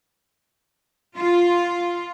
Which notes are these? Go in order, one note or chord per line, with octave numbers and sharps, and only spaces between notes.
F4